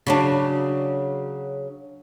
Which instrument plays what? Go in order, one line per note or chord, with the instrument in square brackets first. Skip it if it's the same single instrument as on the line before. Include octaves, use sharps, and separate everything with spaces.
[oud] C#3 F#3 D4